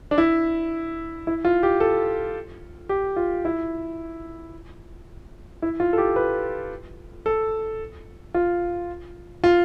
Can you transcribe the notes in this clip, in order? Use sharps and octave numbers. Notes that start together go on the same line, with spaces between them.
D4
E4
E4
F4
G4
A4
G4
F4
E4
E4
F4
A4
G4
B4
A4
F4
F4